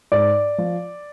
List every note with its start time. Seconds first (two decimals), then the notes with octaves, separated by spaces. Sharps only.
0.12 G#2 D5
0.58 F3